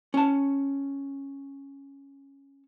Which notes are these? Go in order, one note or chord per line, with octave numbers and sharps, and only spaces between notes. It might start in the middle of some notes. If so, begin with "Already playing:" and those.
C#4 A5